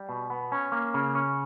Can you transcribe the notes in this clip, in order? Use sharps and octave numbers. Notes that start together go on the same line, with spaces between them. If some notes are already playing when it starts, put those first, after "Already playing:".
Already playing: G3
B2
B3
C#4
A#3
C#3
C#4